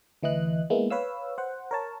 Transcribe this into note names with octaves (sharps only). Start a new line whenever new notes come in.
D2 E3 E4 D#5 F#6
G#3 A#3 B3 E4
B4 C#5 F5 E6
C5 F#5
A#4 C#5 A5